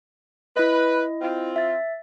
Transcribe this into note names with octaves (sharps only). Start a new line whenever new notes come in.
E4 B4 D#5
C4 F4
E5 A6